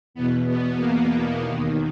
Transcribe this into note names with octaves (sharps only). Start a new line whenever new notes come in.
E2 B2 B3
B3
A#3
B3
D#2 D#3